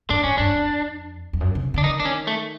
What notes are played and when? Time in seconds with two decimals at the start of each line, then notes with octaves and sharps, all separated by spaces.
0.10 G#2 D4
0.24 G#2 C#4
0.38 G2 D4
0.54 F2
1.33 F2
1.41 F#2
1.55 C3
1.74 D3 D4
1.84 D#3 D#4
2.00 D4
2.05 C#4
2.27 A3